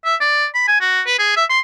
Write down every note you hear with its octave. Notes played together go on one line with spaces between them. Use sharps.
E5
D5
B5
G#5
F#4
B4
G#4
E5
C6